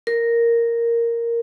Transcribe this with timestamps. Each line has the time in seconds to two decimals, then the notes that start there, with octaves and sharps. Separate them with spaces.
0.07 A#4